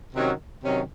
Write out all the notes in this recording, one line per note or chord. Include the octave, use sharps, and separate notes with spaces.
C3 D#3 F#3 C#4
C3 D#3 F#3 C#4